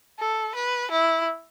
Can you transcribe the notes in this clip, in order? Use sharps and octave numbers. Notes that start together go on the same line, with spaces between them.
A4
B4
E4